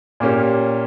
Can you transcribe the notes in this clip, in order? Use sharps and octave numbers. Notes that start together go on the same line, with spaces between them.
A#2 A#3 C#4 G4